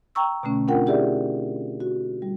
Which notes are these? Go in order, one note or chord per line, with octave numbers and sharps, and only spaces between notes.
G5 A#5 C#6 E6
B2 D3 A3 C#4
C4 D4 F4 A#4 F#5 G5
E4 G4 G#4 D5 E5
F#4
G3